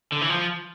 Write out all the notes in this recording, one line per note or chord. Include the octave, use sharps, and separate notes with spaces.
D3
E3
F3